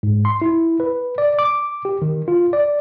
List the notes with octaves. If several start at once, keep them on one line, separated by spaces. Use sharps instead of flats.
G#2
C6
E4
B4
D5
D6
G4
D#3
F4
D5